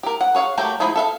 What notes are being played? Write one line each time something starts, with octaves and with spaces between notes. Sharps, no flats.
G4 A#4
F#5
G#4 C#5 F5 F#5
F#3 A3 A#3 G4
F3 D#4 E4 G#4 B5
A4 E5 F5